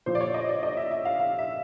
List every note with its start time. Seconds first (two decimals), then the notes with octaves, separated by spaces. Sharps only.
0.06 A#2 F3 C5
0.15 D5
0.21 C#5
0.34 D#5
0.49 D5
0.63 D#5
0.77 E5
0.91 E5
1.05 F5
1.20 F5
1.39 E5